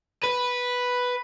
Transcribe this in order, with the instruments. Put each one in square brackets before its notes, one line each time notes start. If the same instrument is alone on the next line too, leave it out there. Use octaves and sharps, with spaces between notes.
[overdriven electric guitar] B4